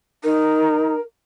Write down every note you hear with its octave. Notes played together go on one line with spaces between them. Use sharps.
D#4 A#4